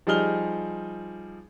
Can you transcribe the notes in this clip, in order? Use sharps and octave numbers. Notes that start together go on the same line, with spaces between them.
F3 G3 D#4 G#4 F6 G7